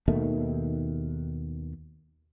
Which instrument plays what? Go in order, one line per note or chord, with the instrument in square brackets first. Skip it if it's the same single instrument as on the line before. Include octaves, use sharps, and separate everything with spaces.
[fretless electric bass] D#2 B2 D#3 A3